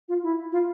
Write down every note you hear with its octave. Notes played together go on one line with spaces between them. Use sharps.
F4
E4
F4